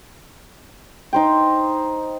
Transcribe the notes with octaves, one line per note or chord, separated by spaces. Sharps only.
D#4 C5 G5